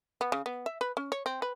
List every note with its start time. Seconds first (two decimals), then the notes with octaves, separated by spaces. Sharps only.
0.21 B3
0.32 C#3
0.46 B3
0.66 E5
0.81 B4
0.97 C#4
1.12 C#5
1.26 C4
1.42 B4